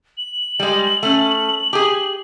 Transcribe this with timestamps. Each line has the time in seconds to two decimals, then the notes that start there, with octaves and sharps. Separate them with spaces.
0.17 F#7
0.60 G3 G#3
1.03 A3 C#4
1.73 G4 G#4